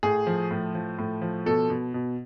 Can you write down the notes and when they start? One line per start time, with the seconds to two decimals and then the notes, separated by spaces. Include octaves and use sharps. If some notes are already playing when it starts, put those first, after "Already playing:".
0.03 A2 G#4
0.27 F3
0.51 A2
0.75 F3
0.98 A2
1.22 F3
1.46 B2 A4
1.70 B2
1.94 B2